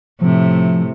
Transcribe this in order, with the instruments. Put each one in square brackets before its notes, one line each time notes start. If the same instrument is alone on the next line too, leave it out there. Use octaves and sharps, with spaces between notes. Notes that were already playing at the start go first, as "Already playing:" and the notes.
[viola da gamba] A2 C3 [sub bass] F3